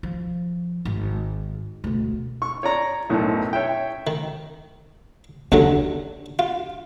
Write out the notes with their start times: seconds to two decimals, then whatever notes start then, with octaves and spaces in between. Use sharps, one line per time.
0.03 F3
0.85 G#1
1.84 E1 D2
2.42 C#6
2.63 C#5 D5 A#5
3.10 B1 F#2 A2
3.53 C#5 E5 G5
4.07 D#3
5.52 D#2 D3 F#3 D4
6.39 F4